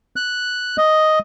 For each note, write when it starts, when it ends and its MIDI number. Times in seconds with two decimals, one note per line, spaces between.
0.16 0.77 90
0.78 1.19 75